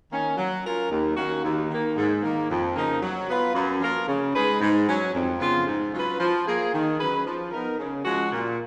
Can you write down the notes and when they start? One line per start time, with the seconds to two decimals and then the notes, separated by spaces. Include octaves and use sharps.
0.10 D#3 A#3 C#4
0.36 F#3
0.64 C#4 F4 A#4
0.90 D#2
1.16 D#3 A#3 C#4 F#4
1.43 D#2
1.69 D#3 A#3
1.96 G#2
2.22 D#3 A#3
2.49 F2
2.75 C#3 F3 A#3 D#4
3.01 F#3
3.28 B3 F4 B4
3.54 F#2
3.80 F3 A#3 F4 A#4
4.07 C#3
4.33 G#3 D#4 G#4 B4
4.61 G#2
4.87 F#3 C#4
5.13 F2
5.39 C#3 F3 B3 F4
5.66 G#2
5.93 F#3 C#4 F4 B4
6.19 F3
6.46 A#3 F4 G#4
6.72 D#3
6.99 F#3 C#4 G#4 B4
7.25 F3
7.51 B3 D#4 A#4
7.78 C#3
8.04 F3 G#3 C#4 F#4
8.31 A#2